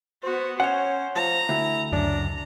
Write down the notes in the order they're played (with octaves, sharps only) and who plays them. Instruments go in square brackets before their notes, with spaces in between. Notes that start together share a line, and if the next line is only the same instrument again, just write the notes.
[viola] B3 F#4 [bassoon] C5
[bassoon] C#4 [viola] C5 [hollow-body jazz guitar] C#5 F#5
[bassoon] F3 [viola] A#5
[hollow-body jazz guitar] D2 [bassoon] E4
[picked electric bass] C#2 F#2 [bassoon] D4 [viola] A#5